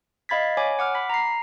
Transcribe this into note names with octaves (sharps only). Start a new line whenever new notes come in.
D#5 F5 B5 G#6 A6 B6
C#5 G#5 B5 D6
F#5 D6 F6
B5 B6
A#5 C7